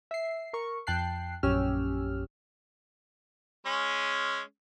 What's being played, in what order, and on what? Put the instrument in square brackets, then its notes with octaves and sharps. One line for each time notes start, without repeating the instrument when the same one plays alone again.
[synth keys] E5 C7
A#4 C#6
F2 G5 A5 F#6 C7
A#1 F#2 C#4 G4 E6 F6
[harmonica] G#3 C#4